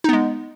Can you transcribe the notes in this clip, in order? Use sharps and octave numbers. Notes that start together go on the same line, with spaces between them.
G#3 B3 D#4